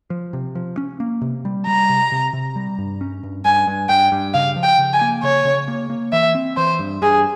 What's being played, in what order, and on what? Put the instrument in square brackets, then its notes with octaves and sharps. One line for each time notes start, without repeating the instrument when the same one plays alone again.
[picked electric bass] F3
C3
F3
C#4
A#3
C3
G3
[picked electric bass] G3 [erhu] A#5
[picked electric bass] C3
C3
C3
G3
G2
C#4
G2
[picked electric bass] G2 [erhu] G#5
[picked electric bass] G2
[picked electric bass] G2 [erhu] G5
[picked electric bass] G2
[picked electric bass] C#3 [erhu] F5
[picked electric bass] F3
[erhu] G5
[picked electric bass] C#3
[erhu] G#5
[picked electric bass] A#3
[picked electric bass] C#3 [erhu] C#5
[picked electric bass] C#3
A#3
A#3
[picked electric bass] E3 [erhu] E5
[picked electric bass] C4
[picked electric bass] E3 [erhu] C5
[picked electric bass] G2
[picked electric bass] G2 [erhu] G#4